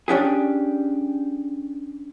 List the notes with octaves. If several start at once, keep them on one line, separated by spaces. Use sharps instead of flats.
C#4 D4 G4 G#4